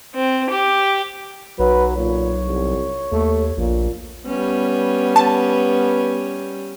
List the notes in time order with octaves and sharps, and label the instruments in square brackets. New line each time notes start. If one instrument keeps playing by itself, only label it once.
[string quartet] C4
G4
[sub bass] B1 [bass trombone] F#3 [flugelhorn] B4
[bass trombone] A#2 [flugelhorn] C#5
[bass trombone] C2
[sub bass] D#2 [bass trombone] A3
[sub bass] A#1 [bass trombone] A#2
[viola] G3 C#4 [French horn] B3
[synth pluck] A5